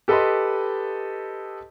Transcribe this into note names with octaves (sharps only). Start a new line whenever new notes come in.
G4 A4 B4 D#5 B5 C6